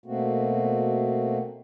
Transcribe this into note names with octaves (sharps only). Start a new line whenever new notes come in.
B2 A3 A#3 C4 F#4